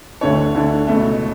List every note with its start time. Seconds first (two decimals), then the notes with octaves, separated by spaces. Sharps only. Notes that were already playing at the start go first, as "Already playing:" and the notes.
0.21 D2 D3 A3 D4 C#5
0.54 D2 D3 A3 D4
0.87 C#2 B2 A3